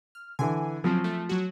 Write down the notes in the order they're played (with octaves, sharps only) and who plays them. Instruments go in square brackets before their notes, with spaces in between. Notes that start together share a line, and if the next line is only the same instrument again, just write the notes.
[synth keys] F6
[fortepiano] D3 E3 [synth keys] G#5
[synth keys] C#3 F#3 C4 [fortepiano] F3
[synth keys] A3
F#3 F#4